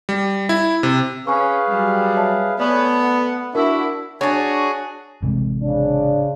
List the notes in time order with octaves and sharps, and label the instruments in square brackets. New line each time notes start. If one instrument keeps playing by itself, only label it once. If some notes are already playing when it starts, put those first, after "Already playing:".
[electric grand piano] G3
E4
C3
[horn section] C#4 [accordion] G#4 B4 F5 [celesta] G#5 B5 C#6
[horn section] F#3 G3
[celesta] C#5 E5 A5
[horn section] A3 B3 [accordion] C#5 G#5 [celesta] D5
[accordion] F#5
[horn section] D4 E4 [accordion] F#4 E5 [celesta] A#4
[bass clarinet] D4 [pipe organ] F#4 G#4 [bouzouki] C#5 [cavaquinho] G#5 A5
[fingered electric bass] A1 C3 G#3
[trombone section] C#3 D4